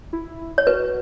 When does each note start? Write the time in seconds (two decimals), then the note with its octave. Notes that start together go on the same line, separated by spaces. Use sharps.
0.13 E4
0.58 C#5
0.67 F#4 B4